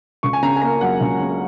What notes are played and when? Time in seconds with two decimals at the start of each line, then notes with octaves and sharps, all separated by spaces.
0.23 C#2 C#6
0.33 G#5
0.43 C#3 A#5
0.56 G#5
0.62 A#3 A#5
0.81 F#3 F#5
1.01 C#2
1.20 C#3